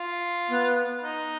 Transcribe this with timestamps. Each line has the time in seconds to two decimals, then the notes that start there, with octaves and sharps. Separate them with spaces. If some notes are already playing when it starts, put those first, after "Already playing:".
Already playing: F4
0.49 B3
1.03 D#4